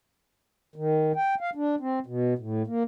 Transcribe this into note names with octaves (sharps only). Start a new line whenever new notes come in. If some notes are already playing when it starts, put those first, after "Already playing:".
D#3
G5
F5
D4
C4
B2
A2
A#3